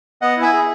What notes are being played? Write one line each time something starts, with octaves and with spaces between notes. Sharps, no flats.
B3 D#5 F#5
E4
E5 G#5
G#4